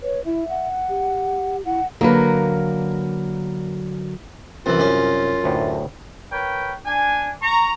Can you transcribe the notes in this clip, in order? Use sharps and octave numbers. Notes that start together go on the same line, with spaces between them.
B4 C#5
E4 E5
F#5
G4
E4 F#5
D3 F#3 A#3 A#4 B4
C2 F#2 E3 F4
F#2 C#4
D2 A2
A#4 B4 C#5 G5
D4 G#5
A#5 C#6